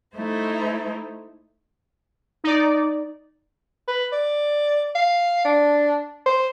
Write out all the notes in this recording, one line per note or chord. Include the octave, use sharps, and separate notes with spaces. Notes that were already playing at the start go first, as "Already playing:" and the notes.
A3 D#4 E4 C5
D#4 D5
B4
D5
F5
D4
C5